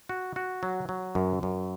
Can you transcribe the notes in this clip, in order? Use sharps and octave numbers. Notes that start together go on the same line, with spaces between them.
F#4
F#4
F#3
F#3
F#2
F#2